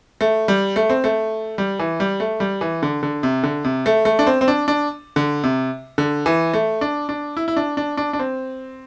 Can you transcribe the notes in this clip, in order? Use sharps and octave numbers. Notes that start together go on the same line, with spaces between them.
A3
G3
A3
C4
A3
G3
E3
G3
A3
G3
E3
D3
D3
C3
D3
C3
A3
A3
D4
C4
C4
D4
D4
D3
C3
D3
E3
A3
D4
D4
E4
E4
D4
D4
D4
D4
C4